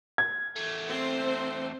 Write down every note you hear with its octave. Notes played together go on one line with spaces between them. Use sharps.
G#6
E2 A3
C4 C5